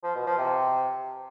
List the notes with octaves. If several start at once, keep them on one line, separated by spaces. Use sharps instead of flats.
F3
B2
F3
C3